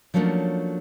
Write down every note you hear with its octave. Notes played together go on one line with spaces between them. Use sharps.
F3 F#3 A3 A#3 C#4 D4